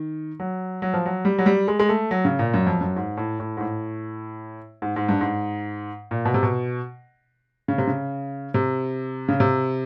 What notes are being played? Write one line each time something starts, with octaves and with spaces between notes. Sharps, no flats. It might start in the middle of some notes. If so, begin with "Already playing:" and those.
Already playing: D#3
F#3
F#3
F3
F#3
G3
F#3
G3
G#3
G#3
A3
F#3
C#3
A#2
F#2
F2
F#2
G#2
A2
A2
G#2
A2
G#2
G#2
G2
G#2
A#2
B2
C3
B2
C#3
C3
C#3
C3
C#3
C3